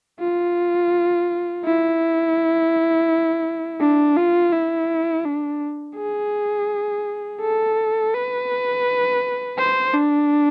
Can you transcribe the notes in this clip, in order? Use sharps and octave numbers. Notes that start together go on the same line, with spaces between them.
F4
E4
D4
F4
E4
D4
G#4
A4
B4
C5
D4